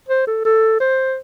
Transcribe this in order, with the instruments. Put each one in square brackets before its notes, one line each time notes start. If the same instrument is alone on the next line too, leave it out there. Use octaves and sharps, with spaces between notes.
[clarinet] C5
A4
A4
C5